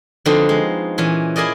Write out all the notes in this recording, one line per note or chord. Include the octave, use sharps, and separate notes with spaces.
D3 F3 B3 C4 D#4 F#4
G#3
A#2 E3 C#4
E4 G#4 A#4 D5 D#5